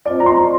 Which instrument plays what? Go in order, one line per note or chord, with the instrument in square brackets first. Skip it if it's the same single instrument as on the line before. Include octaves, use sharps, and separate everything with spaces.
[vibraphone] C4 F4 C5 D#5 [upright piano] D5
[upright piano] A#5
C6